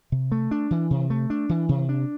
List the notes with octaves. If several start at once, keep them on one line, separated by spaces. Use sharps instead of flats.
C3
A3
D4
E3
C3
A3
D4
E3
C3
D4